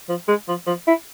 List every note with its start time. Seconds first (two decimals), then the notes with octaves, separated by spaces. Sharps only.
0.09 F3
0.28 G#3
0.48 F3
0.67 F3
0.87 E4